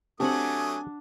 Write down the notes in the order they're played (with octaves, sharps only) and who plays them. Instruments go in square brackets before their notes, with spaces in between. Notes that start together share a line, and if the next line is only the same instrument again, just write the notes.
[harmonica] F#3 A3 D#6 [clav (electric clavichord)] C4 G4 [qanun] D4 F#5 [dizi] G#5